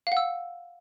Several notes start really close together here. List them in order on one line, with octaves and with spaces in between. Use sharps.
F5 F#5 E6